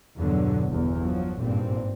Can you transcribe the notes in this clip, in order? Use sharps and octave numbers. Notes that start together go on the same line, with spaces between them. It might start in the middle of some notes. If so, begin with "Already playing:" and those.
E2 G2 B2 D3 F#3
G1 E2
F3 F#3
G#1 G2 A#2 C4